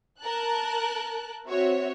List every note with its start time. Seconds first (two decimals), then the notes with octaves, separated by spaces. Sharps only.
0.22 A#4 A5 F#6
1.46 C4 F#4 C#5 E5